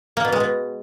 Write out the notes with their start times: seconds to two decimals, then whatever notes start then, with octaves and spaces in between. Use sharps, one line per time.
0.17 A#3
0.25 B2
0.32 G#3
0.40 B2